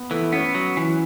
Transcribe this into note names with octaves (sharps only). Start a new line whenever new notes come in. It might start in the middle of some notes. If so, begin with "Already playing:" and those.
Already playing: B3
E3 A3
B3 C#4
F#3
E3